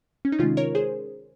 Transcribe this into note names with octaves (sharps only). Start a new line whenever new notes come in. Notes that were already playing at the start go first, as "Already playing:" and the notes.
C#4
D#4
C3 D#3 G#3 C#4 F4
A#4 C#5
G#4 C5